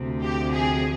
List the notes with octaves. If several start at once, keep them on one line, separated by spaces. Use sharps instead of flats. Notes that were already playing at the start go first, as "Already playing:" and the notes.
Already playing: D2 C3 F3
G4
G#4